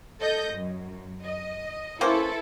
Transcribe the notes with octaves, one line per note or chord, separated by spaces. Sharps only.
A4 D#5 G6
F#2
D#5
A#3 C#4 E4 A4 B4 C5